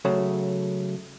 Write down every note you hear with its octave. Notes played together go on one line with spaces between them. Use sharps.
C#3 F#3 A3